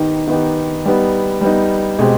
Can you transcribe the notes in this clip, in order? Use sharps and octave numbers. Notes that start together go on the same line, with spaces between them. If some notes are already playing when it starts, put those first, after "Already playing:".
Already playing: D#3 B3 D#4 G4
D#3 B3 D#4 G4
G3 B3 D#4
G3 B3 D#4
B2 G#3 C4 G4